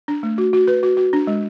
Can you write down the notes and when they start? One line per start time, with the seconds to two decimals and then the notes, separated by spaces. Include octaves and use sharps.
0.08 D4
0.23 A3
0.38 F#4
0.53 F#4
0.68 B4
0.83 F#4
0.97 F#4
1.13 D4
1.27 G#3